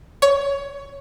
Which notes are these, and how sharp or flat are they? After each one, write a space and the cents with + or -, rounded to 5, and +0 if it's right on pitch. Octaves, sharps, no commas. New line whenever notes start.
C#5 +15